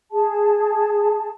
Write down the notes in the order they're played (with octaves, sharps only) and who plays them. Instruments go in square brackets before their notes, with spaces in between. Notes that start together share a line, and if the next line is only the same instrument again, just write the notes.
[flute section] G#4 A5